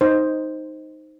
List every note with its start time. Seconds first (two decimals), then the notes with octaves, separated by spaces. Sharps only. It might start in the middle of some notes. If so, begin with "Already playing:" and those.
0.01 D#4 C5